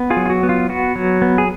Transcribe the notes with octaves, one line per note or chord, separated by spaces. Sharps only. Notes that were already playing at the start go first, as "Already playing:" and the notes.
Already playing: B3
F4 G#4
F#3
F4
F#4
B3
F4
B3 F#4
F#3
B3
G#4